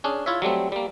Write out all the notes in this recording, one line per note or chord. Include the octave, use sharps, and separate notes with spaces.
C#4 D4 G#4
E4 F4 C#5 E5
F#3 G3 A3 C4
G3 A#3